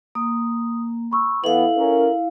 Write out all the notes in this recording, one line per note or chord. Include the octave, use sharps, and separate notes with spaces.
A#3 D#6
B5 C#6 E6
E3 B3 E4 A4 E5 F5 F#7
C#4 A#4